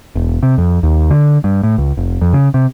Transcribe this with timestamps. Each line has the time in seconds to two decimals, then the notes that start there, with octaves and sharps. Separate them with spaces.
0.15 E1
0.43 C3
0.58 F2
0.83 D#2
1.10 D3
1.44 G2
1.63 A2
1.78 C#2
1.97 F1
2.22 F2
2.33 C#3
2.54 C3